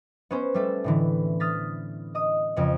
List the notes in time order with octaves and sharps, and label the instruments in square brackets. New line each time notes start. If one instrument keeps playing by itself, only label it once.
[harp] B3 C#4 C5
G3 A3 A4
A2 D3 E3
D#6 F6 A6 B6
D#5 D#6
F2 C#3